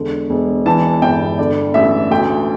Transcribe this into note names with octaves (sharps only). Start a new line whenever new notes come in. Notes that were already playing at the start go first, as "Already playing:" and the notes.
Already playing: E1 D3
E1
E3 A5
G1 G5
D3 D5
A1 E5
D2 G5